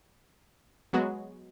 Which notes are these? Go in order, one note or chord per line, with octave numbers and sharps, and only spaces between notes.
F#3 G#3 B3 F#4